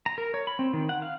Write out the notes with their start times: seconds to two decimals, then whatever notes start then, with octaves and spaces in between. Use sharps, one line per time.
0.06 A#5
0.18 A#4
0.34 C#5
0.47 B5
0.59 C4
0.73 D#3
0.89 F#5
1.02 F5